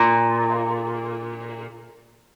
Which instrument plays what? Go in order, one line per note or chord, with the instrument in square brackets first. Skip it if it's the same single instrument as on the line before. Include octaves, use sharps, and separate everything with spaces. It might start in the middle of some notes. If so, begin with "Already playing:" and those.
Already playing: [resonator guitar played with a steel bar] A#2